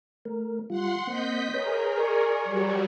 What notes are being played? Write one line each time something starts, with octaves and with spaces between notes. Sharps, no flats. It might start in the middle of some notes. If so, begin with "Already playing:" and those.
A3 A#4
G3 F4 F#5 C6
A#3 C4 D#5 G6 B6
G#4 A#4 B4 C#5
D5 G#5 C#6
F#3 G3